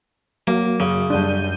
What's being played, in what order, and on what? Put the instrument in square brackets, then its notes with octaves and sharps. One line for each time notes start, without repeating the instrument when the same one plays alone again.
[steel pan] F#3 [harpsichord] A#3
[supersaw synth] F#2 [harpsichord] C#3 [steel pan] F#3
[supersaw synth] F#2 G6 D#7 [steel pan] G3 D4